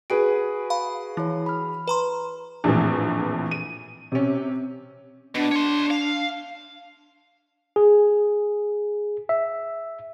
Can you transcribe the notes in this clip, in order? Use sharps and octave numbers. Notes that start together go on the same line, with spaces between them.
F#4 G#4 B4 D7
F5 B5
E3 E4 C#5
B5 F6
B4 A#5 C6
A#1 F2 A2 E3
D#7
C3 C#4
B2 D4
C#5 C6
F5
G#4
E5